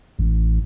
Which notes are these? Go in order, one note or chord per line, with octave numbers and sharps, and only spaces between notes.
A1